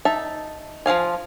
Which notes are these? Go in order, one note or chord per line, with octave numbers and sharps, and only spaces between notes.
D#4 E5 A5
F3 F#3 F5 G#5